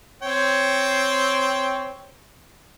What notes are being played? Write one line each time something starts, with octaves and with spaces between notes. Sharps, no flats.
C4 C#5 G5